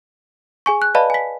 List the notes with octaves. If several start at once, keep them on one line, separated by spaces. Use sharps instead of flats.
G#4 G#5 C#6
F#6
B4 D5 D#5 F5 A5 B5
G#5 B6